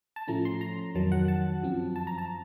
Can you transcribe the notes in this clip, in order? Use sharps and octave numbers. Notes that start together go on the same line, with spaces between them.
A5
A2 F3 A3 C#4 A#5
C6
A#5
F2 D#3 F#3 A5
F#5
A5
F#2 F3 C4
A5
A#5
A5